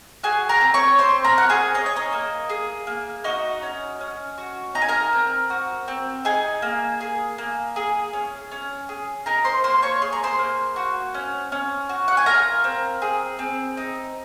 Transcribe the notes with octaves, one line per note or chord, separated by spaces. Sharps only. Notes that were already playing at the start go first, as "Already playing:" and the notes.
F#4 G#4 G#5
A#4 A#5
C4
C#5 C#6
C4 C5 C6
A#4 A#5
F#4 F#5
G#4 G#5
C#4 D#5
C#5
D#4 D#5
A#3
G#4
A#3
D#4 F#4 D#5
C#4
C#4
F#4
D#4 A#5
G#5
A#4 A#5
C4
F#4
C4
D#4 G#4 G#5
A#3
G#4
A#3
G#4
C#4
C#4
G#4
D#4 A#4 A#5
C5 C6
A#3 C5 C6
C#5 C#6
G#4 C6
A#5
C5 C6
A#3
F#4
C#4
C#4
F#4
F#5
G#5
F4 A#4 A#5
C4
G#4
C4
D#4